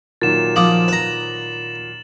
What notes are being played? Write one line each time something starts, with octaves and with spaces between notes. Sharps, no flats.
A#2 D#3 F#3 A6 E7
F3 D6 D#6 F#7
B4 A#5